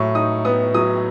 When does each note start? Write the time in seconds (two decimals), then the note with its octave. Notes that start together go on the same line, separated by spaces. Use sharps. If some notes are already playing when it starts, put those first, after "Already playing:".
Already playing: A2 F#3 C#6
0.15 D#4 D#6
0.45 B3 D#6
0.74 F#3 D#6